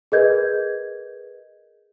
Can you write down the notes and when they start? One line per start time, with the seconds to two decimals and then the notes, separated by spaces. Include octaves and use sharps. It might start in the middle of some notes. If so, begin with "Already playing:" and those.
0.12 G#4 A#4 B4 D#5 G6 G#6